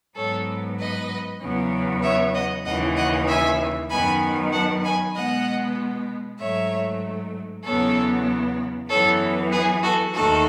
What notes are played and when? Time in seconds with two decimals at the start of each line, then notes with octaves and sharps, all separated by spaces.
0.16 G#2 F#3 B3 A4 C#5
0.79 B4 D#5
1.41 E2 C#3 F#3 B3
2.03 C#5 E5
2.35 D#5 F#5
2.66 D#2 C#3 E3 D#5 F#5
2.97 D#5 F#5
3.28 E5 G#5
3.90 F#2 D#3 F#3 B3 G#5 B5
4.52 F#5 A5
4.84 G#5 B5
5.15 B2 G#3 B3 D#5 F#5
6.40 G#2 F#3 A3 C#5 E5
7.64 E2 C#3 F#3 B3 A4 C#5
8.89 F#2 E3 B3 A4 C#5
9.52 G#4 B4
9.83 F#4 A4
10.14 D#2 D#3 A3 F#4 A4